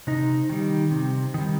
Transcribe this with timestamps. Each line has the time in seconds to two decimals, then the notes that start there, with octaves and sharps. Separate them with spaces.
0.07 C3 D#4
0.49 D#3 G3
0.91 C3
1.34 D#3 G3